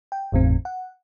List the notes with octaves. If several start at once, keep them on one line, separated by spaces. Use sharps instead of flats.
G5
G1 E2 A2 C4
F#5